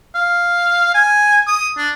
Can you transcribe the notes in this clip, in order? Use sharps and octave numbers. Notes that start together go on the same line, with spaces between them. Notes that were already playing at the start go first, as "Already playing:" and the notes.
F5
G#5
D#6
D4